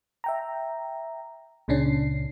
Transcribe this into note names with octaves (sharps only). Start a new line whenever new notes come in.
E5 G5 A#5
C#2 A#2 C#3 C#4 D4 C7